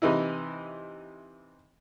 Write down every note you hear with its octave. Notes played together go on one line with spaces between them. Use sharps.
C3 E3 D#4 E4